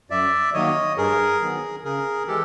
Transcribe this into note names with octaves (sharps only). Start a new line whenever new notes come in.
F#2 D5 E5
D#3 F#3 A#3 C#5 D#5
G2 G#4 A#4
D#3 F#3 B3
C#3 G#4 A#4
E3 G#3 G4 A4